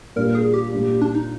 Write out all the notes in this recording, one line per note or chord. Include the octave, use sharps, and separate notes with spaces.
A#2 G3 D4 A#4
G#4
G4
A#2 G3 D4
D4
D#4